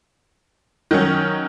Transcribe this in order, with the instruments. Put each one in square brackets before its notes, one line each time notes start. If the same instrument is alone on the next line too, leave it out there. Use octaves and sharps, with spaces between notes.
[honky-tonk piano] D#3 F#3 C#4